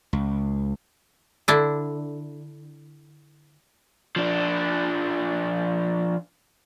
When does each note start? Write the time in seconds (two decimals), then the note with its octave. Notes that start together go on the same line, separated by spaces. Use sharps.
0.13 C#2
1.48 D3 D4 E4
4.16 F3 D4